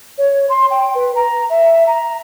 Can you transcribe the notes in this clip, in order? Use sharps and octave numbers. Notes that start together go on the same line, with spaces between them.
C#5
C6
G5
B4
A#5
E5
A#5